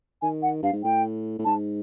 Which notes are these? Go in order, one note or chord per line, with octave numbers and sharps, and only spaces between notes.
D#3 G#5
F#5
G2 F5
G#2
A2 G5
A2
G#2 A5